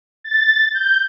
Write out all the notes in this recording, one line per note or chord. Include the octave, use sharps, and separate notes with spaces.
A6
G6